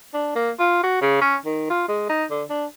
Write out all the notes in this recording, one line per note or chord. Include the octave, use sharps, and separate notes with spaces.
D4
A#3
F4
F#4
C#3
C#4
D#3
F4
G#3
D#4
D3
D4